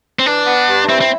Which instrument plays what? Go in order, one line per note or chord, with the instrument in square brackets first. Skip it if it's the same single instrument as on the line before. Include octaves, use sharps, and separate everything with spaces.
[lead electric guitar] C4
[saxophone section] E3 [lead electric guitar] D4
[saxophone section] B3
G2
[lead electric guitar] C4 [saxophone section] E4
[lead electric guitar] C4